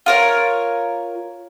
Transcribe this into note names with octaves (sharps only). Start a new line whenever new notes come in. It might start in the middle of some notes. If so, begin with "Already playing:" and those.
F4 A#4 C#5